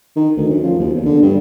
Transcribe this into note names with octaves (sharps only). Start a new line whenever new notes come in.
D#3
D2
F#2
F3
D#2
E2
D3
G2